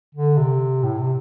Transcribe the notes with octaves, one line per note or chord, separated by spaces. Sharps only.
D3
C3
A2
C3